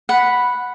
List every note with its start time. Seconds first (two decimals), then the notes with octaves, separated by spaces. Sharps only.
0.09 F#5 B5